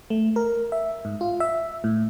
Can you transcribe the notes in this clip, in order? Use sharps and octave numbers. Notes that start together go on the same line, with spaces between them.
A3
A#4
E5
G#2
F4
E5
A2